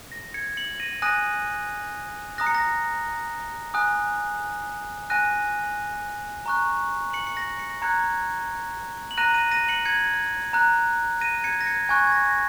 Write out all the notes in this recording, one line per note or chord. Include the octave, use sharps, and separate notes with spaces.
A#6
G#6 C#7
C#7 F#7
A#6 D#7
G#5 D#6 F#6 A#6 D#7
A#5 D#6 F#6 A#6
C#7
A#6
G#5 D#6 F#6
G#5 F#6 A#6 D#7
A#5 C#6 F#6
C#7 F#7
C#7
A#6
C#7
A#6
A#5 F#6 G#6 C#7
F#7
A#5 F#6 A#6 D#7
A#6 D#7
A#6 D#7
C#7 F#7
G#6 C#7
A#5 F#6
A#6 D#7
D#7
G#6 C#7
A#6
G#6 C#7
G#5 C#6 F#6 G#6
G#6
A#6
A#6